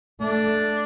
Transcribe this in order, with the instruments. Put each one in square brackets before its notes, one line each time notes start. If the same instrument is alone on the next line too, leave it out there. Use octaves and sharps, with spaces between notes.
[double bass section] A3 [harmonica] D4